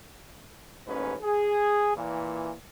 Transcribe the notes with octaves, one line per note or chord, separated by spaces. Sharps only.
A1 D#2 G#2 C#4 B4
G#4
A#2 E3